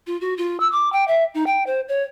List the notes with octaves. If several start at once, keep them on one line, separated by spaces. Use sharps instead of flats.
F4
F#4
F4
E6
D6
G5
E5
D#4
G5
C5
C#5